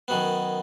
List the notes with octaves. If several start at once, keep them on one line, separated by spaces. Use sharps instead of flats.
F#2 D#3 F#3 B3